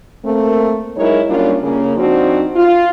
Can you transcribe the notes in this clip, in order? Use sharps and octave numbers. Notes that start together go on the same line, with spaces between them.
A3 A#3 C4
F#3 G#3 D#4 E4 A#4 C#5
F#3 G3 A#3 C#4 D4 F4
C#3 A#3 C#4
F3 C4 D4 D#4 F#4
F4